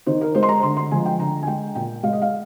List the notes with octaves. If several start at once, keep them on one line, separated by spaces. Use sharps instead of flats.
D#3 C5
A#4
G#3 C5
C6
A#5
D3 C6
C6
F3 G#3 G#5
G5
D3 A#5
G#5
G#3 G5
A#2 G5
G#3 F5
D#5
F5